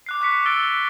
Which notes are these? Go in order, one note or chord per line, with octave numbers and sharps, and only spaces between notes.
D6 F#6 C7
C#6 F#6 B6 C#7
E6 A6 D7 G7